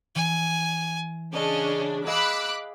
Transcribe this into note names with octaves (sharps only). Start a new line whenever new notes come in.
E3 G#5
C#3 C#4 D4 D#5
G#4 D#5 F5 B5 D6 E6 F#6